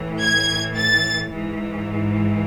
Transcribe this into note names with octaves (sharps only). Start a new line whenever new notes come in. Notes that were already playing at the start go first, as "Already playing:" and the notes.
Already playing: A2 E3
G#6
A6
G#2 E3